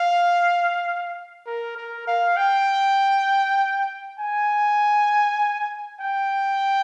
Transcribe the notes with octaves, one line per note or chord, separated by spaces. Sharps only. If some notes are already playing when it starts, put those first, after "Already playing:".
Already playing: F5
A#4
A#4
F5
G5
G#5
G5